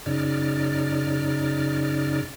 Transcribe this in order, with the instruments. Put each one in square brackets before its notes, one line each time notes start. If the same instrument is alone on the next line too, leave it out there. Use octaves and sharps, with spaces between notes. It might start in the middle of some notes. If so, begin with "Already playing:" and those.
[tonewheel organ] F#2 C#3 D#4 D5 F6